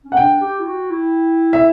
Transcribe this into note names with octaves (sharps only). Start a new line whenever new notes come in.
C#4
F#5
D4 G5
G4
E4
F#4
E4
E5